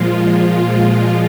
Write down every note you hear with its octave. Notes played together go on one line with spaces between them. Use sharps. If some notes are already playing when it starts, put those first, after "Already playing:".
Already playing: A#2 F3 G#3 F4